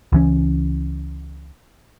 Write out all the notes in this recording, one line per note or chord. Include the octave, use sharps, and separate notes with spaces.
C#2 E3 C#4